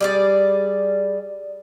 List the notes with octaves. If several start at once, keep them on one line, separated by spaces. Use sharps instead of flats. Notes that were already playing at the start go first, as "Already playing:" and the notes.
G3 G#4 D5